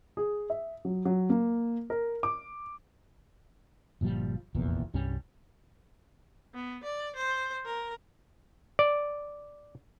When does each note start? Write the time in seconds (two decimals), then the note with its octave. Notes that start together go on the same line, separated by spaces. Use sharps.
0.17 G#4
0.50 E5
0.85 F#3
1.05 F#3
1.30 A#3
1.90 A#4
2.23 D6
4.01 G1 A#2 F3 G3
4.55 F1 A#1 E2 A#2
4.94 C2 G2 G3 C#4
6.55 B3
6.83 D5
7.16 C5
7.65 A#4
8.79 D5